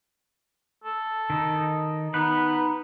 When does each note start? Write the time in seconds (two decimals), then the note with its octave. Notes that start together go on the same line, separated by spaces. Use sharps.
0.84 A4
1.30 D#3 D#4
2.14 B3 D#4 B4